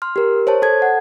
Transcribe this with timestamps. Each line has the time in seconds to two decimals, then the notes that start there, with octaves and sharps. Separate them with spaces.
0.02 C6 F6
0.16 G4 A#4
0.47 C5 C#5 A5
0.62 A4 A5 G#6
0.82 F#5